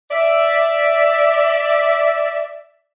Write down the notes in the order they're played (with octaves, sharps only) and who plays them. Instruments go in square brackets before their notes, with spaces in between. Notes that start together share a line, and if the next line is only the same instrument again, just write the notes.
[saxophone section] D5 E5